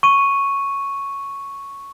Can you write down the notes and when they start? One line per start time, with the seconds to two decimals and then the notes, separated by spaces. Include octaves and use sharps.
0.03 C#6 D#7